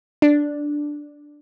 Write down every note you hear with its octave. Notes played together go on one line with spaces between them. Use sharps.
D4